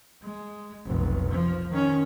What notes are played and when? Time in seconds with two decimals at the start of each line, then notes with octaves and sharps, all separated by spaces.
0.22 G#3
0.85 F1 B1
1.31 F3
1.70 D#3 C#4